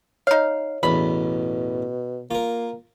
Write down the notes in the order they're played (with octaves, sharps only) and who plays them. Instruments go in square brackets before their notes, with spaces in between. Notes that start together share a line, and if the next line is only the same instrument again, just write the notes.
[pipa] D#4 F5 [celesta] C#5
[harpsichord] A1 E2 [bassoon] B2 [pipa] B5
[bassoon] A#3 [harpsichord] F4 A#4